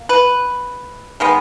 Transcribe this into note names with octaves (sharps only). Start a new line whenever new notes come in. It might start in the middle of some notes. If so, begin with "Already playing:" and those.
Already playing: A#3
B4
D#3 G#3 B3